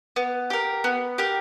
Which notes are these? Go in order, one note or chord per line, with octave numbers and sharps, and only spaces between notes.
B3
G4 A#4
B3
G4 A#4